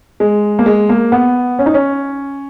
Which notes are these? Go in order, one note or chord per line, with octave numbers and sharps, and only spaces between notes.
G#3
A#3
G#3
A#3
B3
C#4
D#4
C#4